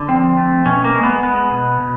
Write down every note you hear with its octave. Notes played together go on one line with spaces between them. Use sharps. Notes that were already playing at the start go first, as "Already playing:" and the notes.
Already playing: D3
F3 C4
A3
B2 C#4
A#3
G#3
B3
G#3 B3
B2
B2